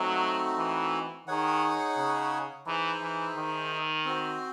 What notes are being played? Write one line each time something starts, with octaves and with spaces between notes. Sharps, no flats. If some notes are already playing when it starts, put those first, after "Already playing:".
Already playing: F#3 A3 C4 D#4 F#4
E3
D#3 D#4 G#4 C#5 F#5
C#3
E3 D#4 G#4 C5 E5
E3
D#3
C4 F#4 C5